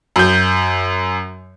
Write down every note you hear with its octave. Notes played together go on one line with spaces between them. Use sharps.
F#2 G6